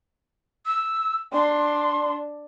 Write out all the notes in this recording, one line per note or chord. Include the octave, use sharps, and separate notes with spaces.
E6
D4 C6